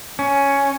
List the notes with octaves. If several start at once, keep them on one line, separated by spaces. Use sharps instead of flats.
C#4